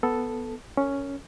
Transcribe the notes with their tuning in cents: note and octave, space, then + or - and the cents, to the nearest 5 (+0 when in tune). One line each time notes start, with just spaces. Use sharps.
B3 +0 A4 +0
C#4 +5 A#4 -25